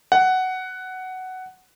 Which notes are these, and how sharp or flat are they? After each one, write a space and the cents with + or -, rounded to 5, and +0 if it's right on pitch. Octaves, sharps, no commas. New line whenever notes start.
F#5 +10